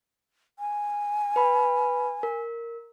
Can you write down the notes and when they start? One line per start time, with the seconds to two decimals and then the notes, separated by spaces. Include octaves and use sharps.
0.59 G#5
1.36 B4 B5
2.23 A#4